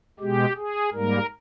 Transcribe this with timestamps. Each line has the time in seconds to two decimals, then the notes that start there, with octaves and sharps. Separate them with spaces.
0.20 B2 G#3 G4
0.56 G#4
0.93 G#2 G3 A#3 A#4